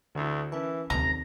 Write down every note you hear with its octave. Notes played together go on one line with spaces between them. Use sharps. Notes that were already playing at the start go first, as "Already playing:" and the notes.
D2 D3 D4 E4
E3 C#4 A#4 A5
G1 D#2 C3 A#5